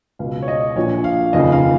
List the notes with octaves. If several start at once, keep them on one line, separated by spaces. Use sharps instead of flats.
C#2 B2 F5
C#5
D#5
A#1 A#2 F3 C#5
F5
F1 D#2 C#3 F3 D#5
F5